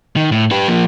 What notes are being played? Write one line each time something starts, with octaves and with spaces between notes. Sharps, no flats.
D#3
A2
G4 B4
F3 A#3